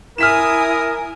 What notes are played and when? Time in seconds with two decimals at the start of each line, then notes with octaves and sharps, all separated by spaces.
0.18 E4 A#4 G#5 D#6 F6 B6 E7